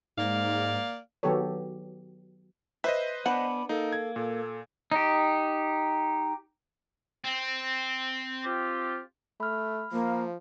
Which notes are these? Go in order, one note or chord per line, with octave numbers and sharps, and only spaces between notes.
G#2 A#3 D5 F5
D#3 F#3 B3 G4 A4 C#5
B4 C5 D#5 E5
B3 D4 F#5 B5
A#3 D#4 A4
G#6
A#2 A4
D#4 G4
C4
C4 F4 G4
A3 B5 F6
F3 A#3